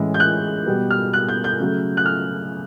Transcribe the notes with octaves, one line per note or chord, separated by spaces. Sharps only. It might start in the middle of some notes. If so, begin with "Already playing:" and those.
Already playing: A2 E3 G#3 C#4
G6
F#6
B2 G3 B3
F6
F#6
G6
G6
C#3 F#3 A3
F#6
F6